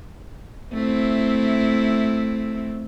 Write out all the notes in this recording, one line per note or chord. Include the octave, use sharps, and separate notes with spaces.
A3 C4 E4